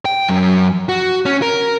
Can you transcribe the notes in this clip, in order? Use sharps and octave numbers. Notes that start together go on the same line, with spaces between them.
G5
F#2
F#4
C#4
A#4